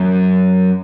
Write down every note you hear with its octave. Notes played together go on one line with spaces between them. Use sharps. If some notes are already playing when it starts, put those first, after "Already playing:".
Already playing: F#2